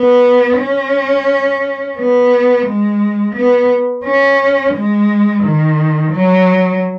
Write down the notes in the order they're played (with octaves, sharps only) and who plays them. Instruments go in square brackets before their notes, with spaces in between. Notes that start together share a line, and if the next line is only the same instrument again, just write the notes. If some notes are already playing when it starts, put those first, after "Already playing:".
Already playing: [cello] B3
C#4
B3
G#3
B3
C#4
G#3
D#3
F#3